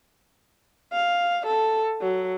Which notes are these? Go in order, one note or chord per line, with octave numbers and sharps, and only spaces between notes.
F5
A4
F#3